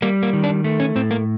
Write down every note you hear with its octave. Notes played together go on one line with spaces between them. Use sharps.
G3 A#3
A#3
D#3
D4
A3
C#4
A2 C4
A#3